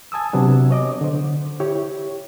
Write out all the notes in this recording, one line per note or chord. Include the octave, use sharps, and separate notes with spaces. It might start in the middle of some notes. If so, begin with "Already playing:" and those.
G#5 A5 D#6 E6
C3 F#3 B3 D4
C#5 D#5 D6
D3 C5
E4 G4 C#5